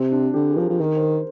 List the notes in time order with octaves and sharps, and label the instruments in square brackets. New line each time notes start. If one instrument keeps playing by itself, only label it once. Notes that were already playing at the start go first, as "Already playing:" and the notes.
Already playing: [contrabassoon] C3 [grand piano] C4
[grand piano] D4
[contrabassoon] D3 [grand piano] G4
[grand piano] G#4
[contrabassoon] F3 [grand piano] A#4
[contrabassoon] F3
[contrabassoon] D#3 [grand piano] A#4
[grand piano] C5
A#4